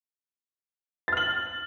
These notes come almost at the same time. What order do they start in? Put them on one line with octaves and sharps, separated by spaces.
A6 F6 F#7